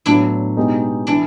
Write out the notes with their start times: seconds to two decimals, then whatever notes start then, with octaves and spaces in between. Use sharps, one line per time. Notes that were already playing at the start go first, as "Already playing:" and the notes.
0.06 A2 F#3 B3 D4 E4
0.56 B2 G#3 B3 D#4 G4
1.07 E3 D4 E4